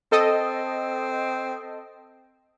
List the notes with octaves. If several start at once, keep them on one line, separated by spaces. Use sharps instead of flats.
C4 A4 D#5